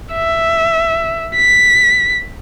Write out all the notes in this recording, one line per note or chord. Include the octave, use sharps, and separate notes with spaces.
E5
B6